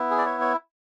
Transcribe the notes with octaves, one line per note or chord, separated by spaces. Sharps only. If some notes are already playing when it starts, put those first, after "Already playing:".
Already playing: B3 E4
G#4
D5
C#5
C#5